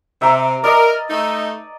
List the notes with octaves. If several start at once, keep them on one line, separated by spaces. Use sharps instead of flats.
C3 E5 A#5 D6
A#4 D5 D#5
A3 D#4